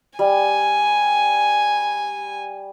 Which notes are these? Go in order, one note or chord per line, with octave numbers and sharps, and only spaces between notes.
G3 G#5